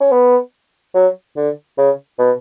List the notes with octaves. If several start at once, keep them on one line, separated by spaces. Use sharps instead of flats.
C#4
B3
F#3
D3
C#3
B2